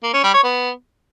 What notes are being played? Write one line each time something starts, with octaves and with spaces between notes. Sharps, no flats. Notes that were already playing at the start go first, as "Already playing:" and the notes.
A#3
C#4
G3
C#5
B3